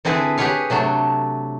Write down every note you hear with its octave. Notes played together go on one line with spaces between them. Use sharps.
D3 C4 E4 G#4 B4
G4 G#4 B4 C#5 F5
C3 F#3 A3 D4